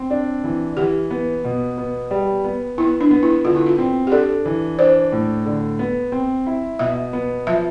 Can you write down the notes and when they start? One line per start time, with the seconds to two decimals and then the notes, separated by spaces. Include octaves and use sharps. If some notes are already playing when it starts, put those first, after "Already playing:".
Already playing: C4
0.11 D4
0.44 E3
0.77 E3 G4
1.11 B3
1.44 B2
1.78 B3
2.11 G3
2.44 B3
2.78 B3 E4
3.01 D4
3.11 B3
3.23 E4
3.45 D3 F4
3.56 E4
3.66 F4
3.78 C4
4.07 G4
4.12 D4 A4
4.46 E3
4.79 D4 C5
5.12 A2
5.46 D3
5.79 B3
6.12 C4
6.47 E4
6.79 B2 E5
7.13 B3
7.47 F3 E5